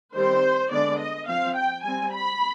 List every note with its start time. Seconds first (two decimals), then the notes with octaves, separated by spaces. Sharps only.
0.14 D#3 G3 C4 C5
0.71 D3 G#3 B3 D4 D5
1.00 D#5
1.27 F3 C4 F5
1.56 G5
1.83 G3 C4 G#5
2.12 B5